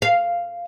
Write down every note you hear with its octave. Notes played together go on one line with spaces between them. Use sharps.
F5